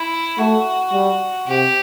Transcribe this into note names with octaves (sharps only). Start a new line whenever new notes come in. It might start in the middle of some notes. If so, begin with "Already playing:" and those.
Already playing: E4
A3 F#4
G3
C3 G4